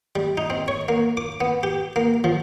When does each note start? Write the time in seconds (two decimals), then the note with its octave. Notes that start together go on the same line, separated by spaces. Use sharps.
0.16 G3
0.38 D#4
0.50 C4
0.68 C#5
0.89 A#3
1.17 D6
1.41 B3
1.63 G4
1.96 A#3
2.24 F3